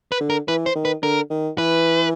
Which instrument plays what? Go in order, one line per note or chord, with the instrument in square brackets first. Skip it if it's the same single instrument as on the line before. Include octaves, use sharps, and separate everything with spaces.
[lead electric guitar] B4
[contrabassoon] D3
[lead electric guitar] A#4
[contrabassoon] E3 [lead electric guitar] B4
[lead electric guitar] C5
[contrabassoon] D#3
[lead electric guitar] B4
[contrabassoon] D3 [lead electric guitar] A#4
[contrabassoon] D#3
[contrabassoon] E3 [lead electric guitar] B4